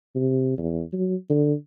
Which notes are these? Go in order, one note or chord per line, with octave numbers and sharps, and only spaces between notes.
C3
E2
F#3
D3